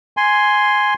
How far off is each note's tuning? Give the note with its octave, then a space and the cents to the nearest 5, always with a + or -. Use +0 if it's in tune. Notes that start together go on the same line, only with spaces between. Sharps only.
G#5 +0 C6 +0